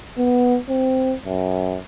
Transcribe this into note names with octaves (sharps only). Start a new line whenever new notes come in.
B3
C4
F#2